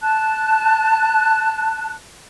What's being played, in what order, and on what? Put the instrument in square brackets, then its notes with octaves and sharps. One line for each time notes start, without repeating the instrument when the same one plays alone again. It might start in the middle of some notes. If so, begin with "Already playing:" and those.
[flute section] A5 F#6